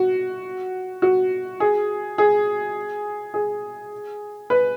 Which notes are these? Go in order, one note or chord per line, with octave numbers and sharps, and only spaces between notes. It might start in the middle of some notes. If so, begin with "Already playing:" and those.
Already playing: F#4
F#4
G#4
G#4
G#4
B4